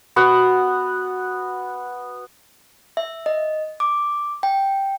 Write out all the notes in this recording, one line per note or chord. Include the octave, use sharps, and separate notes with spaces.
B3 F#4 F#5
E5
D#5
D6
G5